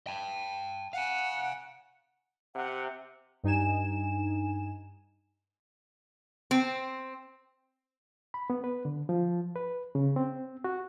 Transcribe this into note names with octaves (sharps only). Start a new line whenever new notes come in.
G5 A5
F5 F#5 G#5
C3 F#5
G2 D#4 G#5 E7
C4
B5
B3
B4
D3
F3
B4
C#3
C4
F#4